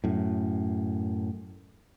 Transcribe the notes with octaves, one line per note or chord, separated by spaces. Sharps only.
F#2 A2